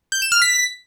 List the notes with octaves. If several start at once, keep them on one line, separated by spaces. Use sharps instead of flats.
G6
E7
F6
B6